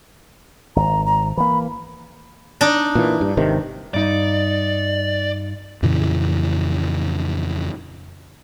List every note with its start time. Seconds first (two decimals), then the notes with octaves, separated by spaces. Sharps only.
0.76 G#1 A#5
1.06 A#5
1.37 E3 A#3 B5
2.61 D4 D#4
2.95 A#2 E3
3.21 G2
3.37 G#1 C3 D#3
3.94 G2 D#4 D5
5.83 F2 A#2 C#3 E3